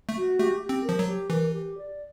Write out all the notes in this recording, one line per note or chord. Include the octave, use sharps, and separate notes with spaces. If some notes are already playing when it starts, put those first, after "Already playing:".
A3
F#4
A3 G4
G4
C4
F3 A#4
F#3
G4
E3 A#4
G4
D5